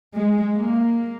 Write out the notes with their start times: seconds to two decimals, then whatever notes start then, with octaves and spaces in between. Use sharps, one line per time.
0.14 G#3
0.56 A#3